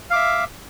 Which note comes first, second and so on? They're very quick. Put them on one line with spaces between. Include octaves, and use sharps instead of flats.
F5 D6 E5